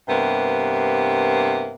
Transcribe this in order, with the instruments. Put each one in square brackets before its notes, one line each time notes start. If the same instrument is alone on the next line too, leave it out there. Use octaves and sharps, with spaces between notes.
[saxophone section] G2 C3 A#3 B3